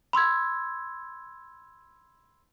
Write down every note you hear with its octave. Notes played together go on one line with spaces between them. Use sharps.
B5 C6 E6 G#6